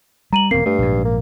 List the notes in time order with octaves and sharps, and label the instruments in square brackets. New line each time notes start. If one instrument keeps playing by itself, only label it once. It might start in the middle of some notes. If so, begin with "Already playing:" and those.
[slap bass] G3 [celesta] A#5 D#7 F#7
[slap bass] E1 C4 [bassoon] A#3 [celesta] C7
[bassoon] G2 [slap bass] A3
[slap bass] A#1 G#2
[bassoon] A#3